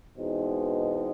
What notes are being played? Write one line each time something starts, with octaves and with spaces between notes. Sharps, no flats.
E2 B2 G#3 C4 D#4